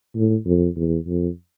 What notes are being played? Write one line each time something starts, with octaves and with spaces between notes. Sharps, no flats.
A2
F2
E2
F2